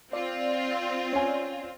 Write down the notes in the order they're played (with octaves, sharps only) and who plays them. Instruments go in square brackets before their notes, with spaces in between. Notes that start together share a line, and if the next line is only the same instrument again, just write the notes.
[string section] C4 F4 [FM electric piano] D5
[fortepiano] C#4 G#5